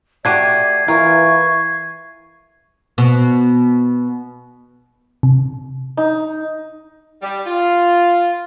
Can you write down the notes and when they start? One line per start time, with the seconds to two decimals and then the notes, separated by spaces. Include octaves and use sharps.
0.25 A3 F#4 G4 D5 G#6 C7 D#7
0.88 E3 F4 A#4 C#6 G#6
2.98 B2
5.23 C3
5.97 D#4
7.22 G3
7.47 F4